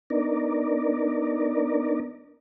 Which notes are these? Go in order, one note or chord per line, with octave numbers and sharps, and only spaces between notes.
B3 D4 D#4 A#4 D5